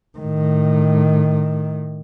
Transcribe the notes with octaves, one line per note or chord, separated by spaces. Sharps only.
A2 D#3